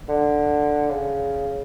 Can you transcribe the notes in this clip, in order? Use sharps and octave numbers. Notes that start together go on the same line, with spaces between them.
D3
C#3